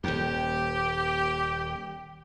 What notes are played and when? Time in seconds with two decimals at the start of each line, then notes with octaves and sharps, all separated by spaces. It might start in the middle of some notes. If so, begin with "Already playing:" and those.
0.04 D#1 D#2 G4